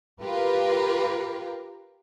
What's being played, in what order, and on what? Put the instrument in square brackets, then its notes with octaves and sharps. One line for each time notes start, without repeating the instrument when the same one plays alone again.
[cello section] F4 G4 A#4 B4